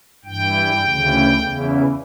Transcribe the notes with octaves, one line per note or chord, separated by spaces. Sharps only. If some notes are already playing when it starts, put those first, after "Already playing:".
G2 E3 G5
D2 C#3 E3
E2 C#3 E3